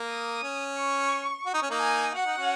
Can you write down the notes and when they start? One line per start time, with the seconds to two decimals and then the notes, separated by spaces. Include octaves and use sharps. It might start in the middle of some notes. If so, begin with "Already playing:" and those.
Already playing: A#3
0.09 D#6
0.43 C#4
0.78 C#6
1.46 F#4
1.54 D#4
1.62 C#4
1.70 A#3 D#4
1.80 G#5
2.14 F#4 F#5
2.26 D#4
2.37 C#4 F#4